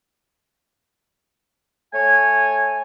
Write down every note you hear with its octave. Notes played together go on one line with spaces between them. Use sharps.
A3 C#5 G#5